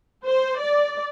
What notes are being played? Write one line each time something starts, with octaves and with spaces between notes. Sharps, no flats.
C5
D5